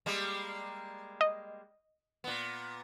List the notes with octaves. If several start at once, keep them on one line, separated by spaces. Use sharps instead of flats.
G3 G#3 A#3
D#5
A#2 B3